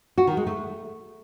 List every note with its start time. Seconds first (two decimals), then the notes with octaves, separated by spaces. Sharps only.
0.18 F#4
0.27 D#3
0.37 G#3
0.47 A3